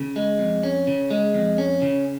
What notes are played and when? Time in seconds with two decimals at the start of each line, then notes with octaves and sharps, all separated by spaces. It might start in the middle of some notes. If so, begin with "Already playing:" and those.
Already playing: C#3
0.16 G#3
0.39 F2
0.63 C#4
0.87 C#3
1.11 G#3
1.34 F2
1.58 C#4
1.82 C#3